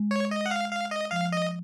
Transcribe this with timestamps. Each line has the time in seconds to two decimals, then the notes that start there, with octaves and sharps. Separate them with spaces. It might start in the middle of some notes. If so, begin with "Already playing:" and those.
Already playing: G#3
0.11 C#5
0.31 D#5
0.46 F#5
0.51 F5
0.71 F5
0.91 D#5
1.11 F3 F5
1.32 D#5